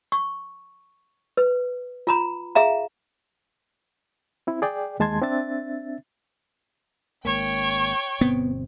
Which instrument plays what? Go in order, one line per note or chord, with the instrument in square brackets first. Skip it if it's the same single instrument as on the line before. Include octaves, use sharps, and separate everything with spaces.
[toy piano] C#6
B4
F4 A#5 B5
G#4 E5 F5 A#5
[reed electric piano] C4 E4
G#4 D5 G5
D#2 G#3 A5 C6 G#6
C4 D4 E5 A6
[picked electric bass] G#1 G#2 A#3 [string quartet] C#5 G5
[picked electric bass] G1 B2 C4 [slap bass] B3